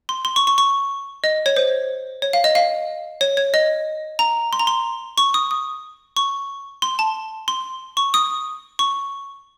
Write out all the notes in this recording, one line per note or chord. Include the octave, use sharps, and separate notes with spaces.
C6
C6
C#6
C#6
C#6
D#5
C#5
C5
C#5
F5
D#5
F5
C#5
C#5
D#5
A#5
C6
A#5
C6
C#6
D#6
D#6
C#6
C6
A5
C6
C#6
D#6
C#6